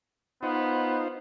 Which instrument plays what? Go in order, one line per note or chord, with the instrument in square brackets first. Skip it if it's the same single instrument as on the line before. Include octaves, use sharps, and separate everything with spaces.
[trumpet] B3 [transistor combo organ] D#4 F4 C5